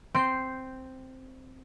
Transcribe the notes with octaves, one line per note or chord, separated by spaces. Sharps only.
C4 G6 C7